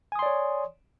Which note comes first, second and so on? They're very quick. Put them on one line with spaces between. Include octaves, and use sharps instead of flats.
G#5 D#6 C6 D5 C#5